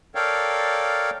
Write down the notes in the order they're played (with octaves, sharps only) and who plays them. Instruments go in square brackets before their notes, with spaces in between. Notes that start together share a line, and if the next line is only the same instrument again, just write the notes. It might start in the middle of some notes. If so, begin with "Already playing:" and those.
[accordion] A4 A#4 C#5 D5 F5 G5